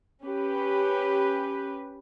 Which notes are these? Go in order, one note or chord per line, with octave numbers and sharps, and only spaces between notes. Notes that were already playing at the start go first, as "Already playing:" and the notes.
C#4 G4 B4